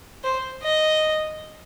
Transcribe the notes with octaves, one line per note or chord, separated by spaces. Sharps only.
C5
D#5